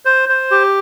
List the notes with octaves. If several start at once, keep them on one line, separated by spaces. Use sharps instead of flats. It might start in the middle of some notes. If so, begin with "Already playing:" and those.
C5
C5
G4